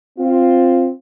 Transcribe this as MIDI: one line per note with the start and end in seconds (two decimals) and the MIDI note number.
0.19 0.89 60
0.19 0.89 65